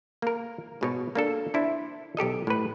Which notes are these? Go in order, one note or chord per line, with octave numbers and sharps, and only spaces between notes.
A#3 A#4
G#2 B2 C#5
A#3 D4 A4
D4 E4 C5 E5
B1 G4 A4 D#5
A2 B4